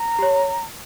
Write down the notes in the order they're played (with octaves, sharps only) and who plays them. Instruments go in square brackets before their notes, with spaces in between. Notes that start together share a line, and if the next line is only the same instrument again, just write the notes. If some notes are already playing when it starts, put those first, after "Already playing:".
Already playing: [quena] A#5
[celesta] G4 C#5